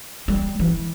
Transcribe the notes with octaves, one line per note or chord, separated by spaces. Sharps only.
G3
E3